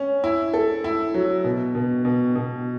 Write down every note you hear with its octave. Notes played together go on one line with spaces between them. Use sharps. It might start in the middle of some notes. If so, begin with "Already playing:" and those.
Already playing: C#4
E4
A4
E4
F#3
B2
B2
B2
B2